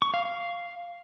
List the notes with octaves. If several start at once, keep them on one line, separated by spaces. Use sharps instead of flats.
C#6
F5
F5